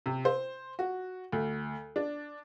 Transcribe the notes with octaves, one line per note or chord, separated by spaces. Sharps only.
C3
C5
F#4
D2
D4